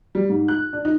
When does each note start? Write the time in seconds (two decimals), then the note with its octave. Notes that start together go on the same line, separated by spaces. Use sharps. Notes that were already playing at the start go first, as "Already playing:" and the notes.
0.15 G3
0.29 G#2
0.48 F#6
0.73 D4
0.85 D#4